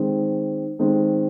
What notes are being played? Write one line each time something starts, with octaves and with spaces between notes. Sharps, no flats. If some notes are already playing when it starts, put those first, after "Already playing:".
Already playing: D#3 G#3 C4
D#3 G#3 C4